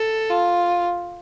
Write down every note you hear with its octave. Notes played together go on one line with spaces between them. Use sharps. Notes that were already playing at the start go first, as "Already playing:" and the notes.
Already playing: A4
F4